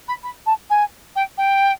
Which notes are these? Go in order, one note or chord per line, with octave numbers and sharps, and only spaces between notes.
B5
B5
A5
G#5
G5
G5